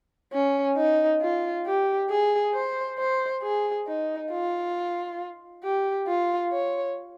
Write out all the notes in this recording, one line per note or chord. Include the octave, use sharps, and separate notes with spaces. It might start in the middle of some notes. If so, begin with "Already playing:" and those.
C#4
D#4
F4
G4
G#4
C5
C5
G#4
D#4
F4
G4
F4
C#5